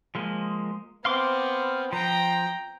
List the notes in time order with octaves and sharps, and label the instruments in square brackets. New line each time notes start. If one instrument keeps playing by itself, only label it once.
[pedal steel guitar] F3 G#3 A#3
[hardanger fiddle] B3 C4 [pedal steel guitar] F5 C6 D6
[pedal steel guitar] F3 [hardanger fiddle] G5 A#5